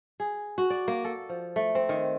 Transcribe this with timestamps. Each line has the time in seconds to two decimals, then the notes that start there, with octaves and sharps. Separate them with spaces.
0.20 G#4
0.58 F#4
0.70 D5
0.88 A#3
1.05 A4
1.29 F3
1.56 A3
1.75 C4
1.89 D#3